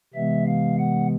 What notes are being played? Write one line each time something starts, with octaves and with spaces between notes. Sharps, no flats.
C3 E3 G#3 B3 E5
F5
F#5